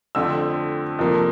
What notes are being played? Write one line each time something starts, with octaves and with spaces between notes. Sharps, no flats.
F2 D3 A3 C4 E6
F2 C3 F3 A#3